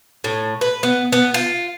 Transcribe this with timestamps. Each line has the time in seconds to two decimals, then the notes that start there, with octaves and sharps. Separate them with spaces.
0.24 A2
0.61 B4
0.83 B3
1.12 B3
1.34 F4